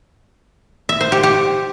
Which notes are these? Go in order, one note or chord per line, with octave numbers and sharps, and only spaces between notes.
E5
C5
G4
G4